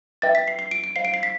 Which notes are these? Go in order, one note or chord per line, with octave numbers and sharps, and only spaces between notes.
B4 E5 G5 A6
B6
C7
C7
D7
D7
C5 F5 C7
D7
C7
B6